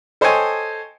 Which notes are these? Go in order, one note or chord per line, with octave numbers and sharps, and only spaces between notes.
A4 C5 C#5 D#5 G5 G#5